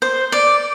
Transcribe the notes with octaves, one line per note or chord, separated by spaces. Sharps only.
C5
D5